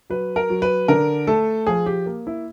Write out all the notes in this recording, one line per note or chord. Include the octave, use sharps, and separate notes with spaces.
F#3 B4
A#4
F#3
B4
D3 A#4
A3 A4
F3 G#4
G4
A#3
E4